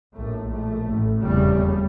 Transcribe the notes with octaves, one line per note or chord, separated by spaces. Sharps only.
A#1 A2 A3
A#1 A2 A3
A1 A2
F1 E2 C#3 G3